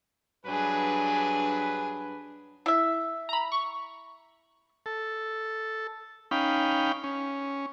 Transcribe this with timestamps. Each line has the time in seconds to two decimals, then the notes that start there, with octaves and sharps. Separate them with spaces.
0.46 G2 F#3 D4 G#4 B4
2.66 E4 E5
3.29 A#5 B5
3.52 C#6
4.86 A4
6.31 C#4 D#4 F5 G5 B5
7.04 C#4